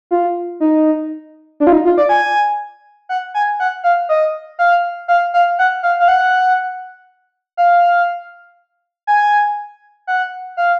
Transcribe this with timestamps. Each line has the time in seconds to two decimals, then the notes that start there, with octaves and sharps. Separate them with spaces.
0.11 F4
0.60 D#4
1.60 D4
1.67 F4
1.72 D#4
1.85 F4
1.98 D5
2.09 G#5
3.09 F#5
3.34 G#5
3.60 F#5
3.84 F5
4.09 D#5
4.59 F5
5.08 F5
5.34 F5
5.59 F#5
5.83 F5
6.00 F5
6.08 F#5
7.57 F5
9.07 G#5
10.07 F#5
10.57 F5